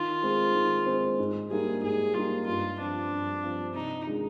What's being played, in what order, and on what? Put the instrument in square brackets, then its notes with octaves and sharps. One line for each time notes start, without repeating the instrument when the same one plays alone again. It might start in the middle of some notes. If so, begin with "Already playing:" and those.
Already playing: [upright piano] D#3 [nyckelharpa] F4
[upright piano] G#3 C4
D#3
G#3 C4
G#2
[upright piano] G3 A#3 D#4 [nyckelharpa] G#4
[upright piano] G#2 [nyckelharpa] G#4
[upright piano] G3 A#3 D#4 [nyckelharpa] F4
[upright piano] G2 [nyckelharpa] F4
[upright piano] F3 C4 F4 [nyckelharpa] D4
[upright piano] G2
F3 C4 F4
[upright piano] C3 [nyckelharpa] D#4
[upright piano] D#3 G#3 D4 F4